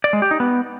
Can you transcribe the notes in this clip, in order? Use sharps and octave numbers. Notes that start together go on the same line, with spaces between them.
D5
G#3
G4
D#4
B3